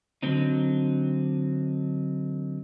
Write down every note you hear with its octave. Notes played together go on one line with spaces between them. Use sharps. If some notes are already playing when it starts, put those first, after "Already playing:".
D3 F#3 C4 D#4